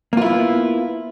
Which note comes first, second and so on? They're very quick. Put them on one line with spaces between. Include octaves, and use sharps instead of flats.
A#3 F4 E4 B3